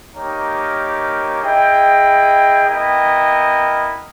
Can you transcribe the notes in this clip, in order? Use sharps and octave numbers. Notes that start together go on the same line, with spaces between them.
A#3 D#4 G4 A#4 C#5
E4 G#4 D#5 G5
B3 E4 A#4 D#5 G5